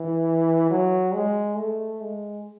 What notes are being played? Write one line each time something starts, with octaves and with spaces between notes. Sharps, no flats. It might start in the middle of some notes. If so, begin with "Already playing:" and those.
Already playing: E3
F#3
G#3
A3
G#3